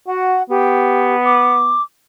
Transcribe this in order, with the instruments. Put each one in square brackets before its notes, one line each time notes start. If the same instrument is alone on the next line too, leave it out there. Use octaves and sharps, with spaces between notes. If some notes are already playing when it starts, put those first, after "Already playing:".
[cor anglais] F#4 [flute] F#5
[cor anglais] B3 [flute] G4
[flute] D6